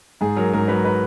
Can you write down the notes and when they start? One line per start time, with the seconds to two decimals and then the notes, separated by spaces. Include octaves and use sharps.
0.21 G#2 G#4
0.37 F#3 A#4
0.53 G#2 A#4
0.68 F#3 B4
0.85 B4